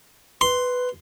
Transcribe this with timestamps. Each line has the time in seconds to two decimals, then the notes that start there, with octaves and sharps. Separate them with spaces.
0.41 B4 C6